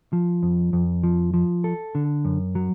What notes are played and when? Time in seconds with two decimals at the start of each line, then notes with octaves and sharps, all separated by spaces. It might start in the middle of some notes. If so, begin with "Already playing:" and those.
0.13 F3
0.43 F2
0.73 F2
1.03 F3
1.34 F3
1.64 A4
1.95 D3
2.25 F#2
2.55 F#3